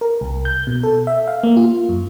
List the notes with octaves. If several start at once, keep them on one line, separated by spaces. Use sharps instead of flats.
A#4
C2
G6
B2
A4
E5
F5
A#3
F4
F#2